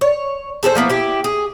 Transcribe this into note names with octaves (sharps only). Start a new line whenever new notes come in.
C#5
G#4 A4 B4 C5
F3 A#3 B3 E4
E4 G4
G#4